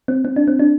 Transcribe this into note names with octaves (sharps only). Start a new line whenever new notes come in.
C4
C4
D4
C4
D4